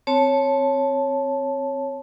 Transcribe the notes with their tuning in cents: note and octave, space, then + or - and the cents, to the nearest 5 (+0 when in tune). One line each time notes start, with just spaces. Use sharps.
C4 +0 C#5 -5 A5 -10